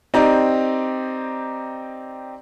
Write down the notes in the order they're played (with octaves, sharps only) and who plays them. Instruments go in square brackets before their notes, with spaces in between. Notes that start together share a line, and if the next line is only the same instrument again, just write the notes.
[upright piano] C4 D#4 G4 D5 A#5